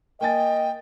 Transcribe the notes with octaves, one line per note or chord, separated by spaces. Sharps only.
A#3 D#5 G5 G#5 A6